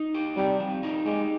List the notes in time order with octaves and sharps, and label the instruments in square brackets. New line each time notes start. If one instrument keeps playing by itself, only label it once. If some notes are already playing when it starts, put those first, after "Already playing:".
Already playing: [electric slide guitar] D#4
G4
[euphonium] G3 [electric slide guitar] C4
[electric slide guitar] F3
D#4
[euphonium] G#3 [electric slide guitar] G4